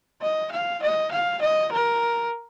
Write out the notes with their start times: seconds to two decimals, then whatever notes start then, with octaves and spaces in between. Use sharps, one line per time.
0.22 D#5
0.51 F5
0.82 D#5
1.11 F5
1.41 D#5
1.72 A#4